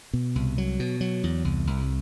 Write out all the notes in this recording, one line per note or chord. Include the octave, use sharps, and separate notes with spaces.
B2
C2
F#3
B2
F#3
E2
C2
C2